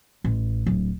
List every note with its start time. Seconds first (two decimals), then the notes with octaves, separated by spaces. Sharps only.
0.24 A1
0.66 D1